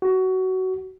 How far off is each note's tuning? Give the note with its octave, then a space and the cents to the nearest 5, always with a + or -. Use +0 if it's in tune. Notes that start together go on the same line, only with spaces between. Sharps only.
F#4 +20